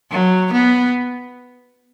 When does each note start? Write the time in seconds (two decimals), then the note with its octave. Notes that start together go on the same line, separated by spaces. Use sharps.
0.11 F#3
0.52 B3